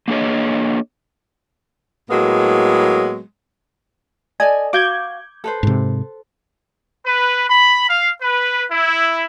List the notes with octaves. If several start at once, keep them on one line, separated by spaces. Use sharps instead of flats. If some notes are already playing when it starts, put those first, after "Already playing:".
A#3 D4 G#4 A4 C#5 D#5
A2 F#3 G#3 A#3 B3
A4 D5 D#5 G#5
F#4 F5 D6 G6 G#6
A4 B4 C5
G#2 C3
B4
B5
F5
B4
E4